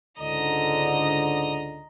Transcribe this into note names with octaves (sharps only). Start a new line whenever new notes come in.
C#2 G#2 D3 D#5 A#5